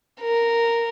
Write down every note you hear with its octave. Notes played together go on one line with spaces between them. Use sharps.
A#4